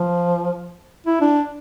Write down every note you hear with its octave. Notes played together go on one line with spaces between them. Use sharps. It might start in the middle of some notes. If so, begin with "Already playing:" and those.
Already playing: F3
E4
D4